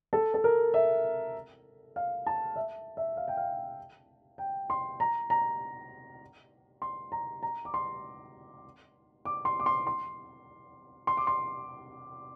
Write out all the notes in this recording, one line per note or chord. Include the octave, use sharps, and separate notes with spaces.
A4
A4
A#4
E5
F5
A5
E5
E5
F5
G5
F5
G5
C6
A#5
A#5
C6
A#5
A#5
D6
C6
D6
C6
D6
C6
C6
C6
D6
C6